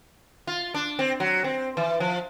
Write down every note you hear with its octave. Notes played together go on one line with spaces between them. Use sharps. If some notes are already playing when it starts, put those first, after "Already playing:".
F4
D4
C4
F#3
C4
E3
F3